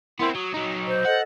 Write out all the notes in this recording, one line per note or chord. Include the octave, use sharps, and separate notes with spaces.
B3 C4 E4 A#4 C6
F#3 D#6
F#3 D#4
C5
A4 D#5 F#5